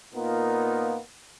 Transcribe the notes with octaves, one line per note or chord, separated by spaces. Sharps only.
A#2 A#3 B3 D#4 F4 A#4